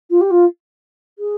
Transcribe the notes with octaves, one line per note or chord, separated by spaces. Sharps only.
F4
G4
F4
G#4